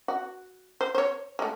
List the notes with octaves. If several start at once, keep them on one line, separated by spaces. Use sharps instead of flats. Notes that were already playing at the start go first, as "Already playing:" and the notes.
F#4
C5
C5 C#5
G#3 A3